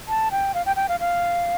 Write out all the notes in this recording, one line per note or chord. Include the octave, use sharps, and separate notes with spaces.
A5
G5
F5
G5
G5
F5
F5